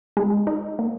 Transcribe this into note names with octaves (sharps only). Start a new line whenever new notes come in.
G#3
D#4
A#3